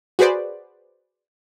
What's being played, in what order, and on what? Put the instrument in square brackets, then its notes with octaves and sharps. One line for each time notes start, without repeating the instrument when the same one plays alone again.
[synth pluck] F#4 G#4 B4 C5 D5